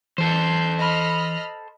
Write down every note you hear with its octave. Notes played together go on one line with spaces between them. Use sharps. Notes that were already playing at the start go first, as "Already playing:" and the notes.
E3 A4 C5 G6
D#5 B5 F6